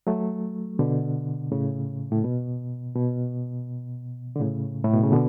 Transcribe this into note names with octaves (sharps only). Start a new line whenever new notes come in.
F#3 A3
B2 D3
A2 C#3
A2
B2
B2
D3
A2 C#3
A2
B2
C#3
B2 D3